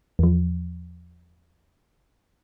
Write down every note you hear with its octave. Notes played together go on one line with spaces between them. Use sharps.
E2 F3